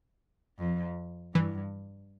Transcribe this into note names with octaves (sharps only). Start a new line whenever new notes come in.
F2
G2 E3